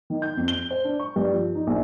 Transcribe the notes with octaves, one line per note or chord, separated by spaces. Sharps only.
D#3
G6
F2
G7
C5
D4
C#6
G2
F3
D#4
A#1